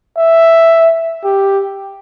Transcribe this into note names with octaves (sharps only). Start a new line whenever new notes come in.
E5
G4